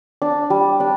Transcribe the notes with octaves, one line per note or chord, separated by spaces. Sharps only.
D4
G3
D4